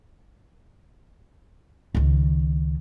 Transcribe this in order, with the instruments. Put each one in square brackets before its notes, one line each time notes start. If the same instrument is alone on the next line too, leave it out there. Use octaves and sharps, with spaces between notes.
[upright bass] C#2 D#3